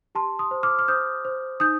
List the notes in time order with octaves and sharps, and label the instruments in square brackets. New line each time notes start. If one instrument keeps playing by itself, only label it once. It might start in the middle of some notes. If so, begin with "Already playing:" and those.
[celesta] G4 A5 C6
C6 D#6
C5
D6 F6
F6
C5 D#6 G6
C5
D#4 D#6 G6